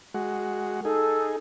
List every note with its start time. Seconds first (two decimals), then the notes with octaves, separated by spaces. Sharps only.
0.14 G#3 F#4
0.85 D#4 G#4 A4